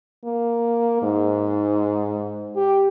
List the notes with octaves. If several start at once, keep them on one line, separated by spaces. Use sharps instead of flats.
A#3
G#2
G4